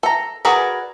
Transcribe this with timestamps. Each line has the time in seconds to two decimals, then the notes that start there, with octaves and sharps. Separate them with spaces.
0.03 A4 A#5
0.45 F#4 G#4 A#4 B4 D5